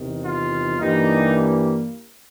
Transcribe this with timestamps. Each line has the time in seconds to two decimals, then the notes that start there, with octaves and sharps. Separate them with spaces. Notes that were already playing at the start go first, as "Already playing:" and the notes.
Already playing: E2 C3 D#3
0.25 F4
0.79 G2 E3 G3 A#3 D#4